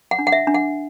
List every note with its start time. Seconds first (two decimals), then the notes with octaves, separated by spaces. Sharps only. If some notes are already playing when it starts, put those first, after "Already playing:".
0.11 F#5
0.19 D4
0.27 F#5
0.32 E5
0.47 D4
0.54 F#5